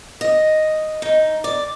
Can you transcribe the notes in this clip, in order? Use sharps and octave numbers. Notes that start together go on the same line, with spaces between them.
D#5
D#4
D5